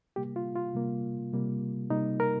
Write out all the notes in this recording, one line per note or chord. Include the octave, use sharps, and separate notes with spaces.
C3 G3 A#3 G4
F4
F4
C3 G3 A#3
C3 G3 A#3
C3 G3 A#3 D#4
A#4